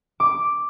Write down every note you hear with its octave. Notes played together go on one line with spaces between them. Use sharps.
D6